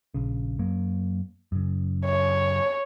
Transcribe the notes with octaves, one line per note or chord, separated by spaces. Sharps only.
A#1 C#3
F#2 F#3 A#3
F#2 C#3
C#5